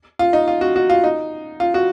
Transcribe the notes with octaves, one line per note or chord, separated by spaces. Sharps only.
F4
D#4
F4
F#4
F#4
F4
D#4
F4
F#4